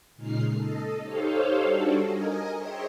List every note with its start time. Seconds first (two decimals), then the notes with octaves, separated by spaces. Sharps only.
0.15 A#2 C#3 G#3 D#4 F6 C7
0.55 A4 D#5
1.02 D#4 G4 A4 C5 C#5 F5
1.62 G3 D4 F#4 A4
2.03 A#4 D#5 G#5
2.56 G#4 C5 C#5 D#5 E5 G5